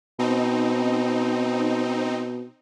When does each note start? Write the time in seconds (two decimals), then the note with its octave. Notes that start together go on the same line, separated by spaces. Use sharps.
0.19 B2 C4 D#4